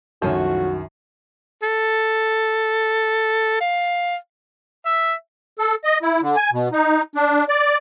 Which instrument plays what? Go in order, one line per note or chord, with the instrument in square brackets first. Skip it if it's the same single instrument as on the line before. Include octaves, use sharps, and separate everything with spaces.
[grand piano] C2 F#2 D#3 [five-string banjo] F3 A3 C#4 [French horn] F#4
[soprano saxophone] A4
F5
[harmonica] E5
[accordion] A4
D#5
E4
D3
G#5
B2
D#4
D4
D5